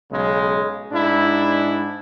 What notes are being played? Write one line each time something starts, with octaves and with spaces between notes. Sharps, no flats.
B1 C#3 G#3
G#2 D4 E4